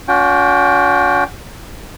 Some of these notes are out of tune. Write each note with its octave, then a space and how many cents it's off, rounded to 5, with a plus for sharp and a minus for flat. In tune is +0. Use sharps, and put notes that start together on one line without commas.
C#4 +45 F#4 -35 G5 +0